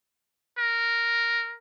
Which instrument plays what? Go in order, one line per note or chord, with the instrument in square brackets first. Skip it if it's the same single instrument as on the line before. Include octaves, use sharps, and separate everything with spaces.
[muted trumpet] A#4